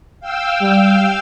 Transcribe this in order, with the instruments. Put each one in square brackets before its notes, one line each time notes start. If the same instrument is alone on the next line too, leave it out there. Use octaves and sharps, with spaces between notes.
[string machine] F5 G5 E6
[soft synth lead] G3